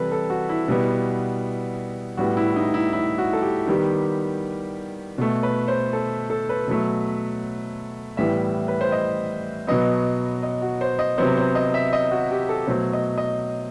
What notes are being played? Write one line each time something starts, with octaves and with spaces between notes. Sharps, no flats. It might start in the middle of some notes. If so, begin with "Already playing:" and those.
Already playing: C3 E3 G3 A4 B4
A4
F#4
E4
B2 G3 B3
A2 G3 B3 F#4
E4
D#4
E4
E4
F#4
A4
G4
D#3 G3 B3 G4
B2 A3
B4
C5
A4
A4
B4
B2 F#3 A3
A2 E3 G3 B3 E5
B4
C5
D#5
B2 F#3 B3 D#5
D#5
F#4
C5
D#5
C3 F#3 B3 C5
C5
D#5
E5
D#5
F#4
G4
A4
B2 F#3 A3 C5
D#5
D#5